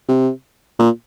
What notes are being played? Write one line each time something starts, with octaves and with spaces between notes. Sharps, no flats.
C3
A#2